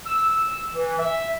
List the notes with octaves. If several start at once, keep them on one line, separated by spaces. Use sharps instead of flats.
E6
E3
E5